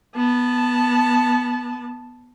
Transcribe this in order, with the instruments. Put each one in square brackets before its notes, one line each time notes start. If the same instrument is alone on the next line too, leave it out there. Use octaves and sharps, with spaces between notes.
[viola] B3 A5